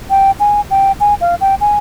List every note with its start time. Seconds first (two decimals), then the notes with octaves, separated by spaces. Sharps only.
0.10 G5
0.40 G#5
0.71 G5
1.00 G#5
1.21 F5
1.41 G5
1.61 G#5